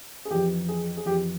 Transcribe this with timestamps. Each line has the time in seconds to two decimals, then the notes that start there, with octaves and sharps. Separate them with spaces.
0.25 G#4
0.31 F2 E3 G4
0.69 G#4
0.97 G#4
1.06 F2 E3 G4